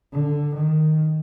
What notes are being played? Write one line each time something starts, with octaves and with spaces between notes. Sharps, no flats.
D3
D#3